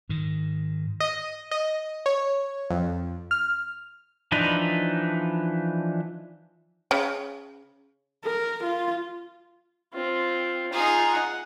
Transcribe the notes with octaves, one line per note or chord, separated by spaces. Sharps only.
G#2 D#3
D#5
D#5
C#5
F2
F6
E3 F3 D4 D#4 B4
C#3
A#4
F4
C4 F4
D#4 F4 G#4 A#5
F#5